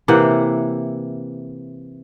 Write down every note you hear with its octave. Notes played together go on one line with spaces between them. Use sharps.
C3 E3 A#3 F#5